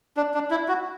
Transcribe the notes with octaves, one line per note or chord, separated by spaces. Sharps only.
D4
D4
E4
F#4